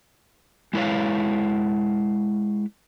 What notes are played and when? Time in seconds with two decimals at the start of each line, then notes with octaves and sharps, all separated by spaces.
0.73 G#3 E4 B4 C#5 F5